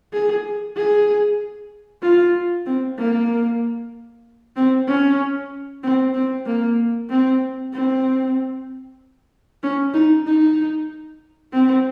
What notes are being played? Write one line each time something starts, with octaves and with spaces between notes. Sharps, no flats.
G#4
G#4
F4
C4
A#3
C4
C#4
C4
C4
A#3
C4
C4
C#4
D#4
D#4
C4